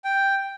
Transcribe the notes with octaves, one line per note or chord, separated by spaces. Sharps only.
G5